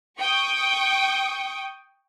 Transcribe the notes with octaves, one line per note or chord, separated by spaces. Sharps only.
G5 C#6 D#6